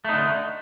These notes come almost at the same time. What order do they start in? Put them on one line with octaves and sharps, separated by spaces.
A3 D#4 D3